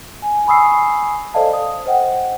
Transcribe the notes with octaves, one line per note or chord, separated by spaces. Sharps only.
G#5
G#5 B5 C#6 D#6 E6 C7
A4 C5 D5 D#5 F5 A5
F5 D#6
C5 D#5 F#5 G5